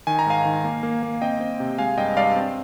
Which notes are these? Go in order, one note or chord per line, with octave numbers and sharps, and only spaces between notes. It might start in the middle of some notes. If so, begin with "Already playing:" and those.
D#3 G#5
A#5
G#2 F5 G#5
D#3
A#3
A#3
A#3
C4 D#5 G5
C4
C3
G#3 F5 G#5
G2 D#5 G5
G2 D5 F5
C4